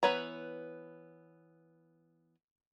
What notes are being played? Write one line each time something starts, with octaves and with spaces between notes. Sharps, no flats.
E3 B3 B4 C#5 A#5